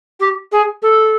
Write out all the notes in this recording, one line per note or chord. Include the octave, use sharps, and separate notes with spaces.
G4
G#4
A4